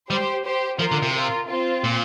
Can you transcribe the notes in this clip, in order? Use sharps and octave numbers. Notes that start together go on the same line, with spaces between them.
G3 G4 C5
G4 C5
F3 F4 A#4
D3
C3
F4 A#4
C4 F4
A#2